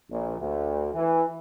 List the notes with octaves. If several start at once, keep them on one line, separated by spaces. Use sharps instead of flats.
A#1
D2
E3